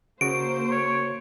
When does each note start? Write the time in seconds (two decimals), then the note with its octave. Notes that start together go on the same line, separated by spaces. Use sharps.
0.21 C#3 A#3 F#4 C5 C#6 D7
0.71 C#5